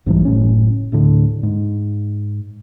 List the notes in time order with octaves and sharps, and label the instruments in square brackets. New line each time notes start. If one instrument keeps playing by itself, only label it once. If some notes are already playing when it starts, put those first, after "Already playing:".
[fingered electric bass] B1 G#2 E3 G3
F#1 A2 C#4
D1 A2 D3
G#2